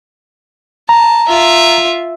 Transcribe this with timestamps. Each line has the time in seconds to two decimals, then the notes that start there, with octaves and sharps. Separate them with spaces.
0.89 A5 A#5
1.28 F4 E5